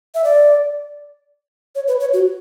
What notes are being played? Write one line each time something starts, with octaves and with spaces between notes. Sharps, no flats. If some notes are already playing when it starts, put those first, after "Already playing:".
E5
D5
C#5
B4
C#5
F#4